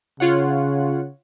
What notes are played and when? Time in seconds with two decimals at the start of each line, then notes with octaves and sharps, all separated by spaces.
0.20 C#3 F4 C#5 F#5